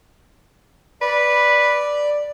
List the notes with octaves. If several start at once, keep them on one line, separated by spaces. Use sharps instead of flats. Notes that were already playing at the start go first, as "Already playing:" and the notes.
B4 D5